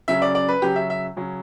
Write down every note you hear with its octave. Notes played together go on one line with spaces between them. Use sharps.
C#3 F#3 C#4 E5
D5
D5
B4
C#3 F#3 C#4 G4
E5
E5
C#3 F#3 C#4